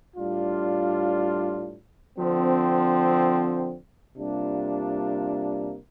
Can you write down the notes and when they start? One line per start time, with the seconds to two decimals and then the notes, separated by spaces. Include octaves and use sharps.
0.16 A2 G3 D4 F4
2.17 D3 F3 C4
4.16 C3 G3 A#3 D4 F4